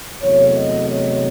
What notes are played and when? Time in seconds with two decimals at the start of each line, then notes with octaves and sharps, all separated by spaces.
0.22 E2 C3 F#3 A3 C#5
0.56 D#5
0.89 C#5